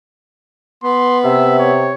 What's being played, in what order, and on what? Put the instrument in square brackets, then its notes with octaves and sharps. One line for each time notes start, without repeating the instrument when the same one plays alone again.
[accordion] B3 [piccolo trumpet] C6
[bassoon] C3 [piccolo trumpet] E5
[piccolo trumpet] C#5